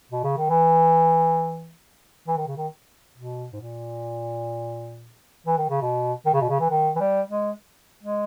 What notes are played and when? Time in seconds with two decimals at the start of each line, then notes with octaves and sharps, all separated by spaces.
0.11 B2
0.24 C#3
0.37 D#3
0.50 E3
2.27 E3
2.37 D#3
2.47 C#3
2.57 D#3
3.16 B2
3.53 G#2
3.60 A#2
5.46 E3
5.58 D#3
5.70 C#3
5.82 B2
6.26 D#3
6.34 C#3
6.41 B2
6.49 C#3
6.60 E3
6.70 D#3
6.96 E3
7.00 G3
7.30 G#3
8.03 G#3